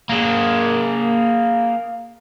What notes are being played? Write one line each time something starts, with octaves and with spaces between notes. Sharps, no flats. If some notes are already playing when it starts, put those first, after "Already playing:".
A#3 G#4